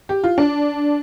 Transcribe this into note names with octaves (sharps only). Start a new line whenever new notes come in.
G4
F4
D4